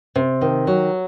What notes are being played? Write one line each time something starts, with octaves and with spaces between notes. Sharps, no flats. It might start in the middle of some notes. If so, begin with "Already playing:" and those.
C3
D#3
F#3